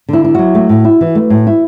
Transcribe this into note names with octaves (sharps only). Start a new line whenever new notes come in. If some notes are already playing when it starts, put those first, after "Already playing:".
D3 E4
E4
F#3 F#4
A3
A2
E4
E3
A3
A2
E4